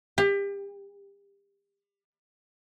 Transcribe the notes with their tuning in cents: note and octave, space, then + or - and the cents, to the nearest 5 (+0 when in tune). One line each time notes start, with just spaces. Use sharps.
G4 +30